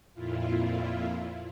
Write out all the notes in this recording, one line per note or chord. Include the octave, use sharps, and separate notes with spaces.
F2 A#2 E4 F4